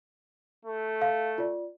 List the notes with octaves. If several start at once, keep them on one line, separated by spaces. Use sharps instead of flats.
A3
F5
F4 D5